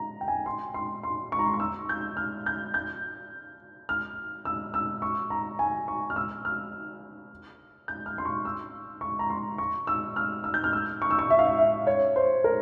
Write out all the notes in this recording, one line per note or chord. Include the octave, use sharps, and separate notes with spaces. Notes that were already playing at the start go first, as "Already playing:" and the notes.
Already playing: A#5
G5
G#5
C6
C6
C6
C#6
A#5
C6
C#6
E6
G6
F6
G6
G6
F6
E6
E6
C#6
A#5
G#5
C#6
F6
E6
F6
G6
F6
C6
C#6
E6
C#6
A#5
C6
C#6
E6
F6
E6
G6
F6
E6
C#6
E6
C#6
E5
F5
E5
E5
C#5
C5
A#4